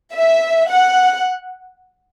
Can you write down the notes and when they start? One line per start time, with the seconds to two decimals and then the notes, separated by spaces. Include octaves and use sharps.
0.15 E5
0.69 F#5